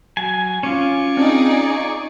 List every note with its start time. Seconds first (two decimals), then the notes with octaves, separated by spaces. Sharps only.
0.17 F#3 G#5
0.63 C#4 F4 G#5 C#6 D6
1.17 C4 D4 D#4 G#4 D5